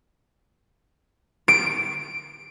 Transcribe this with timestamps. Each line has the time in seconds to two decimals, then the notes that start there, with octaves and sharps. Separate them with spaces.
1.48 D7